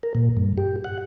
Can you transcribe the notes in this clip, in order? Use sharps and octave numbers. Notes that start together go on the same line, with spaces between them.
A#4
A#2
G2
G4
F#5